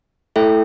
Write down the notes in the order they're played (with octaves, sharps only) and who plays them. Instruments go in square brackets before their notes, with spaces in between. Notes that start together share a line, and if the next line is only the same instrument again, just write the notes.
[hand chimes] A3 E4 A4 E5 G5